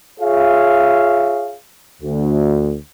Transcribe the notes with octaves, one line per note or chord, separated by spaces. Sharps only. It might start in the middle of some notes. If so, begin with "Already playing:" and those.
F4 G#4 C#5 E5 F5
D2